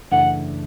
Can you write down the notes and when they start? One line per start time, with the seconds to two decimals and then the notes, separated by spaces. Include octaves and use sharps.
0.11 F#2 C#3 E3 A3 D4 F#5